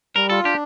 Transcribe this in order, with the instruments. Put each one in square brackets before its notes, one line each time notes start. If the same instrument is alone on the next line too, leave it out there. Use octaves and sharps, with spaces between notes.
[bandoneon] G3 [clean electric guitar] A#4
[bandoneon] F4 [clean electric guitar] A4
[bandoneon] D4 [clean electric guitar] G4